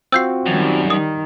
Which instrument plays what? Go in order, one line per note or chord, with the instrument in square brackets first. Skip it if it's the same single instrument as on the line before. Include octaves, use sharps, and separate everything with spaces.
[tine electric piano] C4 F4 F#4 [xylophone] E6 G6 C7
[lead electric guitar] F#2 [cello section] D#3 G3
[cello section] D#3 [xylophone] D#6